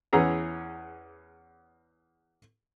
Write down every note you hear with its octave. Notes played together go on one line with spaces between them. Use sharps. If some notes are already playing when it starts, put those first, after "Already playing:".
E2 E3 C#4 G#4 A#5